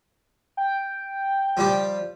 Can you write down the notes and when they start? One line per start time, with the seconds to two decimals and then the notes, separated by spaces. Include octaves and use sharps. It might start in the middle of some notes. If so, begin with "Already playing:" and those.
0.57 G5
1.57 F3 G3 G4